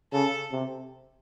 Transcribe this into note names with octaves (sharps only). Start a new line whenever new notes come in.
C#3 A4
C3